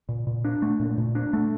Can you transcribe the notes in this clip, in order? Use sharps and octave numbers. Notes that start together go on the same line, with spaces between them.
A#2
A#2
D4
A3
A#2
A#2
D4
A3